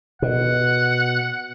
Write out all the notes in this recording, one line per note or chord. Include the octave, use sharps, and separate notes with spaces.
B2 F#5